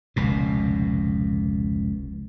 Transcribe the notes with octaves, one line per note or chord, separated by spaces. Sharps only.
F1 C#2 B2